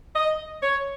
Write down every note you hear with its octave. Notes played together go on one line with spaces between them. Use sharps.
D#5
C#5